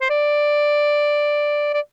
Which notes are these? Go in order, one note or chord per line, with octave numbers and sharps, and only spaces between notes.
C5
D5
D5